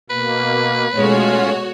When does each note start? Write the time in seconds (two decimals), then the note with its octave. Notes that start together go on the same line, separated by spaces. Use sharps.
0.10 B2 A#3 B4
0.95 B2 G#3 A3 C#4 F4 F#4 C#5